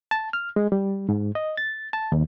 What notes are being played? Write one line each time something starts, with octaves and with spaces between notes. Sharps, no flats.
A5
F6
G#3
G3
G#2
D#5
A6
A5
D#2